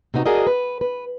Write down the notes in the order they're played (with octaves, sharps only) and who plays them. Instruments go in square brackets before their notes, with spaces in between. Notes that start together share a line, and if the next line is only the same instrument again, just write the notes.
[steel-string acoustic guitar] C3 B3 D#4 F#4
F#4 G#4 A#4 D5 D#5
B4
B4